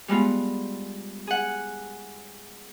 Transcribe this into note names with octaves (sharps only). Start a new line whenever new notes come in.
G3 G#3 B3 F4
G#4 F#5